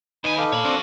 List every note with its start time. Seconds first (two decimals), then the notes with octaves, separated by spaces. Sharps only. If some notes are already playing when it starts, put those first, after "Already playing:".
0.24 D#2 D#4 B4 G#5 B5
0.38 A4 F5 D6
0.53 A#2 C#5 B5
0.65 C4 D4 F#4 A#4